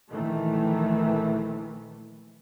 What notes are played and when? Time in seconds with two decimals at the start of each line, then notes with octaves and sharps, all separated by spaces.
0.10 A#1 D#3 E3 A3